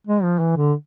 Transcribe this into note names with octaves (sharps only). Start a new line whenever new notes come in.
G#3
F3
E3
D3